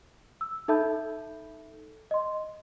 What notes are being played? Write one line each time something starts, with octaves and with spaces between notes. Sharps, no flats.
E6
D#4 A4 E5 A5 B5 G6
D#5 C6